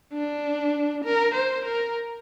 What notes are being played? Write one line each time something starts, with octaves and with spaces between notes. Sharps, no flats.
D4
A#4
C5
A#4